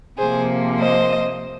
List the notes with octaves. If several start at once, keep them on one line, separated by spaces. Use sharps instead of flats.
C3 F3 A#3 G#4 C5
C5 D#5